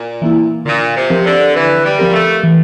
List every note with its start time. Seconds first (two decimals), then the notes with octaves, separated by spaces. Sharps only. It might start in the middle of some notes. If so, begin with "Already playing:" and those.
Already playing: A#2
0.22 E3 A#3 E4
0.65 A#2 D3
0.96 C3
1.10 F3 C4 G4 A#4
1.25 D3
1.54 D3 E3
1.84 G3
1.99 F3 C4 G4 A#4
2.13 A3
2.43 E3